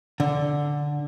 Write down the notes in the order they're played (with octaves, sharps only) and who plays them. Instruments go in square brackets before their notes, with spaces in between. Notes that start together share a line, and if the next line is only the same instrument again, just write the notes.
[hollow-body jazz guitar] D3